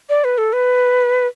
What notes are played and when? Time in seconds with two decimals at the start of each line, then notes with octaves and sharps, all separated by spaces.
0.09 D5
0.24 B4
0.38 A4
0.53 B4